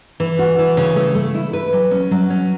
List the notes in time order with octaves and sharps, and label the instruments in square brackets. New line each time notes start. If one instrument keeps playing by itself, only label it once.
[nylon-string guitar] E3
F#4
E3
C#3
A3
A3
E4
B4
F#3
C#4
F#3
C#4